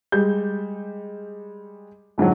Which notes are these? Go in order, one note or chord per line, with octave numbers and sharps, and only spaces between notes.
G3 G#3 G6
F2 G#2 D3 F#3